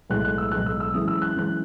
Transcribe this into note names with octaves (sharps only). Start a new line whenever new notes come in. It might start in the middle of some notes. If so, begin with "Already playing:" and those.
B1 A2 G#3 F#6
F#6
E6
B1 A2 G#3 F#6
E6
E6
F#2 E3 G#3 D#6
E6
F#6
F#2 E3 G#3 F#6